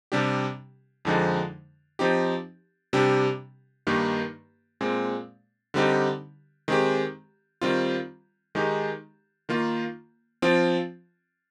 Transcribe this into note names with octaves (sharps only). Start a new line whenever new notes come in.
C3 G3 D4 G4
F2 D3 F3 G#3 D#4
F3 C4 D#4 G4
C3 G3 D4 G4
G2 D#3 A#3 D#4 G4
A#2 G#3 C4
D3 G3 C4 D#4 G4
D#3 G#3 C4 G4
D#3 G3 C4 F4
D#3 G#3 D#4 G4
D#3 A#3 F4
F3 C4 F4